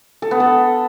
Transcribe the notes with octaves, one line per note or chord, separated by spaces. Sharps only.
A4
B3
A4